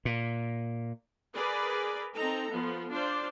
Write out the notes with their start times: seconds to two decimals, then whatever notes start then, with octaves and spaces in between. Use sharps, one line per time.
0.05 A#2
1.35 G#4 A#4 B4 D5
2.15 C4 D#4 A4 A#5
2.50 F3 B3
2.91 D4 F4 C5 D5